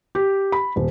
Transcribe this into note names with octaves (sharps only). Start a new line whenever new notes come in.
G4
B5
D#1